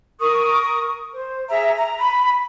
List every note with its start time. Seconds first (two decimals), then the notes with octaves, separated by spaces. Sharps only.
0.20 A#4 C#6 D#6
1.13 C5
1.49 G#4 E5 A#5
1.77 A#5
1.97 B5